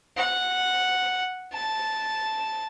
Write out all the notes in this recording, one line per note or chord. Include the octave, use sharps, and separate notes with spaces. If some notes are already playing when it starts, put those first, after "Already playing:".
F#5
A5